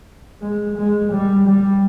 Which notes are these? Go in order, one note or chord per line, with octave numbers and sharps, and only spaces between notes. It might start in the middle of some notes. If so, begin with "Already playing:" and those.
G#3
G#3
G3
G3